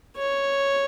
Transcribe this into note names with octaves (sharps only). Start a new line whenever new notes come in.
C#5